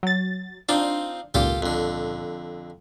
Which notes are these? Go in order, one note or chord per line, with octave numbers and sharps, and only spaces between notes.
F#3 A6
C4 D4 D#4 F4
G#1 C#2 A#2 F4 G4 A4
F2 D3